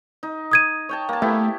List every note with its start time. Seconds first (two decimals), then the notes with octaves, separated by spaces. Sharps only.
0.23 D#4
0.51 D#6 G#6 D#7
0.89 C#5 G5 A5
1.09 A#3 A5
1.22 A3 B3 E4 G4